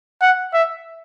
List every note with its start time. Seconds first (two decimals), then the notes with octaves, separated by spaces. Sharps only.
0.21 F#5
0.54 E5